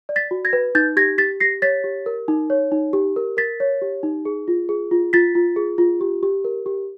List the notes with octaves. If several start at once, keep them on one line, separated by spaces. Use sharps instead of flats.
D5
A6 B6
F#4
G#6 A#6
B4
D#4 G6 A6
G4 G#6 A#6
G4 A6 B6
G4 A#6 C7
C#5 A6 B6
G4
A#4
D#4
C#5
D#4
G4
A#4
A#4 A6 B6
C#5
G4
D#4
G#4
F4
G#4
F4
F4 A6 B6
F4
G#4
F4
G4
G4
A#4
G4